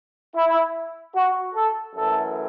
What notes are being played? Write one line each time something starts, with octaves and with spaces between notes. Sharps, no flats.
E4
F#4
A4
F#2 E3 A3 A4